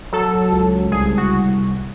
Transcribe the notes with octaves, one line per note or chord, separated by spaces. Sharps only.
F#3 A4
C#2
C2 G#4
F#4